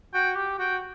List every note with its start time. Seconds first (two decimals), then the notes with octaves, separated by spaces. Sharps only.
0.14 F#4 G5
0.36 G4
0.59 F#4 G5